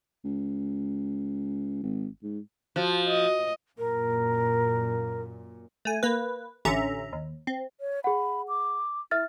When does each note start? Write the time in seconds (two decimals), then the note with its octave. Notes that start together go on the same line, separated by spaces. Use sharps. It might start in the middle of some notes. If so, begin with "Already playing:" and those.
0.24 C#2
1.83 G#1
2.23 G#2
2.76 F3 F#4
3.08 D#5
3.78 F#2 A#2 A#4
5.85 A3 G#5
6.03 A#3 B4
6.65 A1 D3 C#4 E5 A#5
7.13 D#2
7.47 C4
7.81 C#5
8.04 G#4 F#5 B5
8.48 D6
9.11 E4 E5 F6 A6